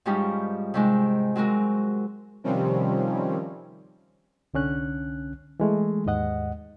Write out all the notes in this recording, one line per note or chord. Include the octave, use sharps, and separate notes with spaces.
G#2 F3 G3 C#4 D#4 G4
C3 D#3 G#3
F#3 G#3 C4 F#4 A#4
C3 D#3 F3 G3 C4 C#4
C2 D3 C#4 F#6
E3 G#3 A3
D#2 G#2 D#5 F#5